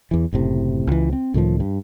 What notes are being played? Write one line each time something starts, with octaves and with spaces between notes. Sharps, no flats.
E2 E3
F#1 A2 C3
C#2 E3
C4
C#2 A2 D#3 F3
G2